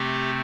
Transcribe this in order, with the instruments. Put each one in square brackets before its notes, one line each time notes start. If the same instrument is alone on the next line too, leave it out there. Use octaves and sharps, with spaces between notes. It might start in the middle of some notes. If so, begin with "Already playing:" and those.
Already playing: [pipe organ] C3 A3 C4 G4